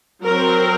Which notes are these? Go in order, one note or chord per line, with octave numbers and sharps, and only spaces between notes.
F#3 C4 A#4